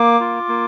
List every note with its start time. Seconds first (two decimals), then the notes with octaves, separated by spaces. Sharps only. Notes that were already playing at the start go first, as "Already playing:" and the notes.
Already playing: A#3 D6
0.20 F4
0.49 A#3